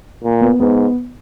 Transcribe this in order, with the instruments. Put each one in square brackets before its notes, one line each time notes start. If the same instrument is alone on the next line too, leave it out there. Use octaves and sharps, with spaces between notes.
[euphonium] A#2
[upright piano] B3
[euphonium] G#2 [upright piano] B3